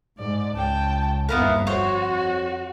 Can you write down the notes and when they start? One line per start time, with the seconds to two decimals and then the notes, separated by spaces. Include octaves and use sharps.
0.19 G#2 D5
0.54 C#2 G5 A5
1.29 G1 D#2 B3 E4 A#4 F5
1.67 F2 F#4 C5 C#5